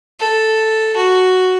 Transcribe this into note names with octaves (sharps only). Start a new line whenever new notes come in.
A4
F#4